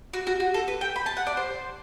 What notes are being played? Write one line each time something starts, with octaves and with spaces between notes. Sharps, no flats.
F#4
F#4
F#4
A4
B4
G5
B5
A5
F#5
D5
C5